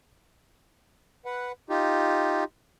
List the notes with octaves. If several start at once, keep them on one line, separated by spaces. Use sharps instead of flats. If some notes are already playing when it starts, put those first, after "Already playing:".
B4 F#5
D#4 F4 G4